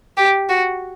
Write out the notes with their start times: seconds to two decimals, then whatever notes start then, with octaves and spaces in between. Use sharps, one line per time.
0.17 G4
0.49 F#4